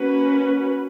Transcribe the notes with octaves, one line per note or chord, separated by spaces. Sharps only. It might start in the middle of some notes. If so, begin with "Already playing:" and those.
Already playing: A#3 C#4 F#4 B4